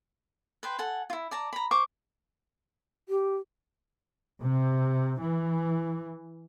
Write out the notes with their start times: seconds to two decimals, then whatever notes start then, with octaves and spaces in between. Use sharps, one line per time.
0.63 B4 C5 G5
0.78 A4 F#5 G#5
1.10 E4 F4
1.31 D5 A5 A#5
1.53 A#5 B5
1.71 C5 C#6 D6
3.09 G4
4.42 C3
5.20 E3